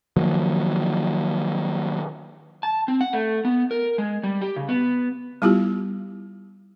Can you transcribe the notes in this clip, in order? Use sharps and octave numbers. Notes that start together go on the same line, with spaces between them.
D#3 F3 F#3 A#3
A5
C4
F#5
A3
B3
A#4
G#3
G3
G4
C#3
B3
G3 B3 E4 F4 G4